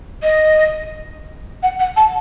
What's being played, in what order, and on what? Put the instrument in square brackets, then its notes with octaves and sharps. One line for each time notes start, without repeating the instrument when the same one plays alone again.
[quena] D#5
F#5
F#5
A5